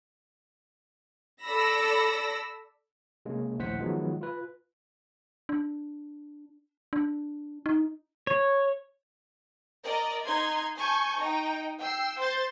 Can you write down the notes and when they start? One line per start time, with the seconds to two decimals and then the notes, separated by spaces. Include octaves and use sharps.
1.44 A4 D5 B5 E6 A#6
3.25 C3 G#3 A#3 C#4
3.59 A#1 D#2 A2 C5 F#5 B6
3.79 D#3 F3 F#3 G#3 B3 F4
4.21 F4 B4
5.49 D4
6.93 D4
7.66 D#4
8.27 C#5
9.82 A#4 D5 D#5
10.24 D#4 C6 G#6
10.77 G#5 A5 C#6 G6
11.19 D#4 G5
11.81 G5 E6 C7
12.18 C5 C6 G6 A6